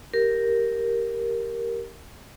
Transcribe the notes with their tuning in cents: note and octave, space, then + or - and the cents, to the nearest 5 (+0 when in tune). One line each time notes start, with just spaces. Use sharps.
G4 +0 A#4 +0